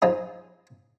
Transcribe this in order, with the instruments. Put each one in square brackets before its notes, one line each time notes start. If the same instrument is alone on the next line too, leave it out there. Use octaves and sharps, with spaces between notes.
[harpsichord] F3 F#3 D#4 G#4